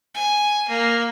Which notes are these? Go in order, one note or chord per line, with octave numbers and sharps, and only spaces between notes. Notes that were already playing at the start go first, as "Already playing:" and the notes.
G#5
A#3